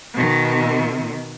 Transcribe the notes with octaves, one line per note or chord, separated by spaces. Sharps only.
B2 D#3